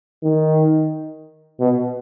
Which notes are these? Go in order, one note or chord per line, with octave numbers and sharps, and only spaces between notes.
D#3
B2